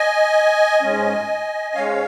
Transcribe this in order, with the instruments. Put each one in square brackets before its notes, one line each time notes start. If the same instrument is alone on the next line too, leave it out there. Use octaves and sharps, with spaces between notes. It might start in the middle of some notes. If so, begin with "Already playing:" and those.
Already playing: [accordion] D#5 G#5
G#2 G#3 C#4
G#2 G#3 C#4 C#5 F5